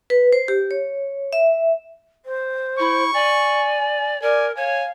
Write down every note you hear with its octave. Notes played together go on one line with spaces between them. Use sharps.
B4
C5
G4
C#5
E5
C5
E4 C#6
D5 G#5
A#4 D5 G#5
C#5 F5 G#5